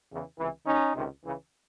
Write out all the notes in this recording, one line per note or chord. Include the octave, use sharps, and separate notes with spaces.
E2 C#3 E3
C#2 C3 E3
D#2 D#3 C#4 D#4
C#2 C3 D#3
C#2 C#3 E3